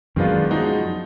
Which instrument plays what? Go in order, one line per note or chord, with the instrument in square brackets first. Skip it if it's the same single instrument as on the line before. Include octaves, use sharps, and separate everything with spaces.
[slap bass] F#2 [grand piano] D#3 G#3 B3 D4 F4
[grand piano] F3 G#3 D#4 F#4